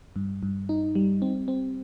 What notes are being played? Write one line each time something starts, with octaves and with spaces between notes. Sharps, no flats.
G2
G2
D#4
G3
C4
C4